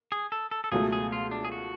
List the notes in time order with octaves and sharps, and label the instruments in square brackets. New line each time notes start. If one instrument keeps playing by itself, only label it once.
[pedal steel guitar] G#4
A4
A4
A4
[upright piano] C#2 B2 F#3 A3 [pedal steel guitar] G#4
[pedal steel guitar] G#4
F4
D4
G#4
F#4